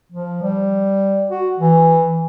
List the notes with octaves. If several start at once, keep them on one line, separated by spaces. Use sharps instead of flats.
F3
G3
F#4
E3